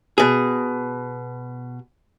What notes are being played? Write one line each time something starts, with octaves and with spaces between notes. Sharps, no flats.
B2 G#4